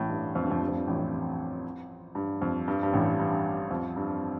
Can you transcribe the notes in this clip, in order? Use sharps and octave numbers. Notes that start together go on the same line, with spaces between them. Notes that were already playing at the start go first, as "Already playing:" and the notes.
Already playing: A1 A2
G2
F2
G2
F2
G2
F2
G2
A1 A2
G2
F2
G2
G2
A1 A2
G2
F2
G2